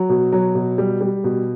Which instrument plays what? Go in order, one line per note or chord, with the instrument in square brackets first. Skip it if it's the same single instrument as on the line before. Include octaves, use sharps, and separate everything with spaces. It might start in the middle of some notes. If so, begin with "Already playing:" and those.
Already playing: [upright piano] F#3
B2
F#3
B2
G3
G3
B2